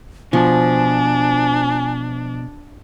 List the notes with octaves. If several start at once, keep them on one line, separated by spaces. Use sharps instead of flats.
B2 F3 D4 G#5